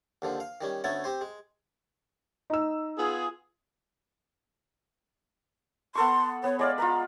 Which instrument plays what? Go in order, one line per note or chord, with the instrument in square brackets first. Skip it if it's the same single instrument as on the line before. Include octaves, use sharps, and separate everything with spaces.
[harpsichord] D#2 D3 F3
F5
D#3 G3 C#4
D2 A3 B3 C#4 C#5 A5
C4 G4 C5
G#3
[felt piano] D#4 E6
[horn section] B3 F4 G#4
[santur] B3 A4 C#6 [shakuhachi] C6
[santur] B3 [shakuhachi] C#5
[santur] G#3 D5 F5 [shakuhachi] C#5
[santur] F4 B4 [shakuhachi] A#5